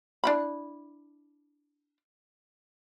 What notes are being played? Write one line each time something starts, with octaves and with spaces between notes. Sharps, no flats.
D4 E4 B5